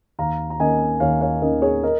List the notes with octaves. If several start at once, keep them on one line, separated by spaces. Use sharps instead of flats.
D#2 F5 A#5
A#5
D#3 A#3 C#4 D#5 G#5
D#2 C#5 F5
C#5 F5
D#3 A#3 C#4 A#4 D#5
G#4 C#5
A#4 D#5